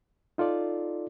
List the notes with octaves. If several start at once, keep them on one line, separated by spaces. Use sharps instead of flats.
D#4 F4 A4 D5